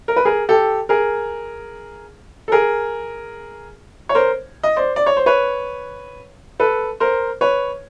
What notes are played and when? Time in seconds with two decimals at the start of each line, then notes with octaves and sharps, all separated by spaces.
0.08 A#4
0.16 B4
0.25 G#4 A#4
0.49 G4 A4
0.89 G#4 A#4
2.48 A4
2.52 G#4 A#4
4.09 C#5
4.15 A#4 C5
4.63 D#5
4.76 C5 D5
4.96 D5
5.06 C#5
5.17 C5
5.26 B4 C#5
6.60 A4 B4
7.00 A#4 C5
7.41 B4 C#5